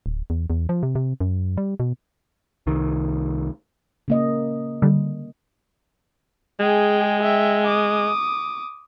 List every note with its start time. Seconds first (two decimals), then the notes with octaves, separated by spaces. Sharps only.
0.06 D1
0.30 E2
0.50 E2
0.69 F3
0.83 C3
0.95 C3
1.21 F#2
1.57 G3
1.80 B2
2.67 C2 D#3
4.08 C#3 A#3 D#5
4.82 D3 G3
6.60 G#3 G#4 G5
7.23 E5 G5
7.66 D6 D#6